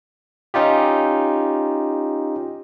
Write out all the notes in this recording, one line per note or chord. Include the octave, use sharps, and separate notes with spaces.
C#4 D#4 F4 G4